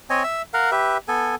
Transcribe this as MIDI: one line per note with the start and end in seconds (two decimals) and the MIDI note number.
0.10 0.23 60
0.10 0.23 73
0.10 0.23 75
0.10 0.23 80
0.24 0.42 76
0.24 0.42 88
0.54 0.71 70
0.54 0.71 77
0.54 0.71 78
0.72 0.97 67
0.72 0.97 71
0.72 0.97 76
1.08 1.35 59
1.08 1.35 69
1.08 1.35 80